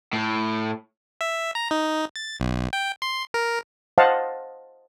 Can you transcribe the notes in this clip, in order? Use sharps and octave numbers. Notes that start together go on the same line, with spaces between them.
A2
E5
A#5
D#4
A6
B1
G5
C6
A#4
C5 D#5 F5 F#5 A5